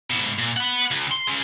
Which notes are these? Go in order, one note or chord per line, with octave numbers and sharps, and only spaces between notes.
G#2 B2
A#2
B4 F#5
C#2
C6
G#3 C#4